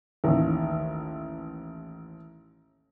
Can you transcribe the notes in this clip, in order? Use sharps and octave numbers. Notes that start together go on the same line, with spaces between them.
A1 D#2